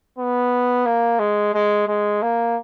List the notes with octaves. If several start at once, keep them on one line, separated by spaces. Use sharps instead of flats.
B3
A#3
G#3
G#3
G#3
A#3